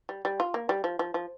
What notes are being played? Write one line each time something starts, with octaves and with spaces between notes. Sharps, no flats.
G3
G3
F4
A#3
G3
F3
F3
F3